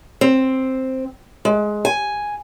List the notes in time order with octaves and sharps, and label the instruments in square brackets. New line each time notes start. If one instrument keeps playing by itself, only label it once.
[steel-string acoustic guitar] C4
G#3
G#5